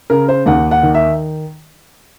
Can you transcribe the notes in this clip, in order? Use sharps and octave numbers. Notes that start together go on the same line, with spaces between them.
C#3 A#4
C5
D#2 F#5
F#5
D#3
E5